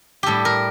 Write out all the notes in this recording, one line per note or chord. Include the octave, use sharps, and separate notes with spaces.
A2 G3 G4 A4
A#4